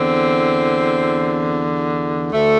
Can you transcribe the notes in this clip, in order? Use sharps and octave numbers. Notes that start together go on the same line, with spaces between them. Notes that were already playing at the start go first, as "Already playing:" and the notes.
Already playing: E2 D3 C4
D2 D3 A3